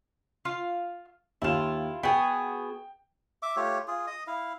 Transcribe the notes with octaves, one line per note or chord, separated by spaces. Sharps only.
F4 F5
D#2 E4 F4 E7
B3 F#4 G#4 G5
E5 D6
A3 F4 G4 C#5
F4 G#4
D#5 D#6
E4 F5